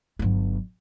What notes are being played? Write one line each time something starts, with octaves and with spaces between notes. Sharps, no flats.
G1 F#3